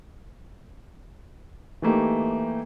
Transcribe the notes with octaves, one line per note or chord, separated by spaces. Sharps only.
E3 A3 A#3 D#4 G4